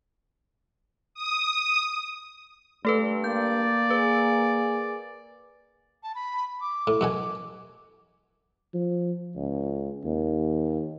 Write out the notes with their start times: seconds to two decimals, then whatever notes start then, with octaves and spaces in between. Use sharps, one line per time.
1.14 D#6
2.85 G2 A3 A4 B4
3.24 A#3 D5 G6
3.90 G#4 B4
6.03 A5
6.15 B5
6.61 D6
6.87 A2
7.01 F#2 B2 G#5
8.74 F3
9.36 C#2
10.04 D#2